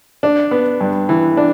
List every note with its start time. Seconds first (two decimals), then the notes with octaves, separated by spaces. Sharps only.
0.23 D4
0.51 B3
0.81 G2
1.09 E3
1.37 D4